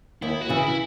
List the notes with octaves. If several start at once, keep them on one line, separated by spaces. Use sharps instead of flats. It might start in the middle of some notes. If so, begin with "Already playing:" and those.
D#2 E4
F#4
C#3 E3
E4